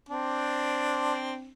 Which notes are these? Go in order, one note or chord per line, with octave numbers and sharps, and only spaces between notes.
C4 D4